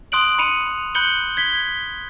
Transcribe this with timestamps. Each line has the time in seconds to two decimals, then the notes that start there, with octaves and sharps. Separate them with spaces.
0.12 C6 D#6 F#6 D7 F#7
0.39 B5 C#7 D#7 F7
0.95 B5 F#6 G6 C#7 F#7 G7
1.37 G#6 B6 G7